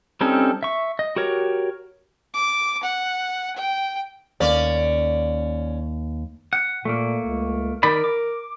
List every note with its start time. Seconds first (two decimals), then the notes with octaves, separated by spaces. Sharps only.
0.21 G3 C4 C#4 D#4 A4
0.63 E5 C#6
0.99 D#5
1.16 F#4 G4 A#4 C#5
2.34 D6
2.83 F#5
3.56 G5
4.40 D#2 C#4 C#5 D5
6.53 F#5
6.85 A#2 A3 A#3
7.24 C#2
7.83 D#3 A#4 D5 B5
8.04 D6